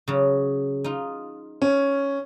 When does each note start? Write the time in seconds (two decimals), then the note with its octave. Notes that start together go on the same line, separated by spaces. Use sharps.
0.08 C#3 F#3
0.84 D#4 F4
1.62 C#4